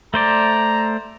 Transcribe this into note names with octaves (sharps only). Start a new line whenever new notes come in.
A3 C5 D5 A#5